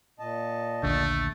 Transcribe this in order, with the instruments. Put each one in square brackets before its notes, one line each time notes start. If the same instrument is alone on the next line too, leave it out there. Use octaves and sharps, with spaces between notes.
[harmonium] A#2 D#5 A5
[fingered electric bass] A#1 D#2 D3 [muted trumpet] A3